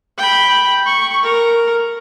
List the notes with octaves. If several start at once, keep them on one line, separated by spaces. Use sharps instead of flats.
G5 B5
C#6
A#4